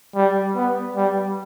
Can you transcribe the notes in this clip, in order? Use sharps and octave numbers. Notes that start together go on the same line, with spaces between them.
G3
B3
G3